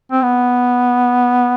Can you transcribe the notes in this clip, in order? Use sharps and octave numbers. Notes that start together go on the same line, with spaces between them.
C4
B3